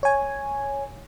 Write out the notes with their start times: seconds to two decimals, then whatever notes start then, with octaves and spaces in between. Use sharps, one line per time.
0.03 C#5 G#5